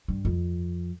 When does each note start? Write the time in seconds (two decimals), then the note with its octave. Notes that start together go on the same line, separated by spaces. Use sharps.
0.08 G2
0.25 F2